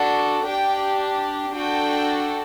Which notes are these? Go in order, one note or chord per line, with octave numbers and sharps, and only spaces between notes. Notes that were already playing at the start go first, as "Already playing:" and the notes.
Already playing: D4 F#4 A4
D4 G4 G5
D4 F#4 A4 G5